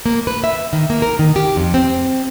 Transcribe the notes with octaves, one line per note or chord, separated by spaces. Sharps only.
A#3
B4
E5
D#3
A#3
A#4
D#3
G4
F2
C4